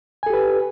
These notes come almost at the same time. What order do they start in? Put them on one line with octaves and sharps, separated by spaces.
G#5 A4 G4 B4